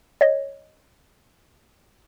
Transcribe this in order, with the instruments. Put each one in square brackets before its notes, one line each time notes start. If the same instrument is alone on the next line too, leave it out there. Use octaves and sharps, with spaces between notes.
[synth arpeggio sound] C#5 D#5